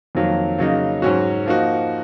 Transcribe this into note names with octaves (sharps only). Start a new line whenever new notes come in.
F2 D#3 F#3 A#3
C#3 F#3 A#3 D#4
G#2 F#3 C#4 F#4
F3 A#3 D#4 F#4